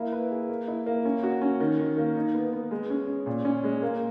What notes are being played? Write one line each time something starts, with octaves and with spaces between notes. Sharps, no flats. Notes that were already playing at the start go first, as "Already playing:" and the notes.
Already playing: A#3 E4
B4
G#4
A#3
E4
A#3
C#4
F#4
C#4
D#3
D#3
A#3
D#4
B3
B3
G#3
C#4
C#4
A#2
C#4
G#3
A#3